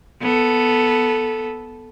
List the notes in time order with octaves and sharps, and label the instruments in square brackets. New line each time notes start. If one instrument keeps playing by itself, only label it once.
[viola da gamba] B3 A4